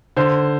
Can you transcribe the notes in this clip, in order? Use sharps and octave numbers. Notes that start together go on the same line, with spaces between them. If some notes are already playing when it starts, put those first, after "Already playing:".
D3 C5